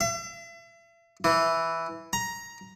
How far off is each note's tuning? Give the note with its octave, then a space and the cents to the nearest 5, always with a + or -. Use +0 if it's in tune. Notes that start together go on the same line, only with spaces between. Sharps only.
E5 +40
E3 +0
A#5 +10